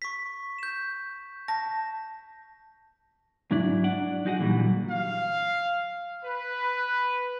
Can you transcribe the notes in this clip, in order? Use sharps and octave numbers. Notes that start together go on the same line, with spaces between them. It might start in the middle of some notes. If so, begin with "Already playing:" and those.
C#6 B6
G6 E7
A5 A#6
G#2 F#3 D4 E4 D5
D4 D5 F#5
F#3 D#4 F#4 G#4 F#5
A#2 D3 E3 F#3 G3
F5
B4